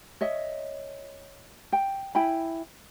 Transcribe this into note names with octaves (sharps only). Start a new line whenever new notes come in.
C#5 D#5 E5
G5
E4 G5 G#5 B5